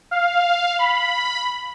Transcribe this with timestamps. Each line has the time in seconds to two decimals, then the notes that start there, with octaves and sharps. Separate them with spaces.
0.11 F5
0.79 B5